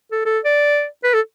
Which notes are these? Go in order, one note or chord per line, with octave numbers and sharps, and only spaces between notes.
A4
A4
D5
B4
A4